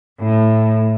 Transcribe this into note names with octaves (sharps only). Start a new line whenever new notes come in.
A2